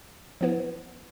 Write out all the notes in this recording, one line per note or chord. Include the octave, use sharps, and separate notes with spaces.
F3 B3 E4 B4